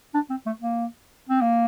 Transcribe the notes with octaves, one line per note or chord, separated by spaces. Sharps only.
D4
C4
A3
A#3
C4
A#3